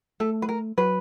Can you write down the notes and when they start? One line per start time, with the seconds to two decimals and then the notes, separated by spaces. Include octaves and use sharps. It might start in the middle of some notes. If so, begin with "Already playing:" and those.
0.20 A3 A4
0.42 B4
0.49 A#4
0.78 F#3 B4